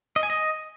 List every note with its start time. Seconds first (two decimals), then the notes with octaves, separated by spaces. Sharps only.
0.16 D#5
0.23 G#5
0.30 D#5